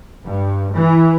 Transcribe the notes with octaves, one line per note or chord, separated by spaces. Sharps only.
G2
E3